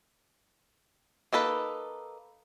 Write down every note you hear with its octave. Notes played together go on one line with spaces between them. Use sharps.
A#3 D#4 A4 B4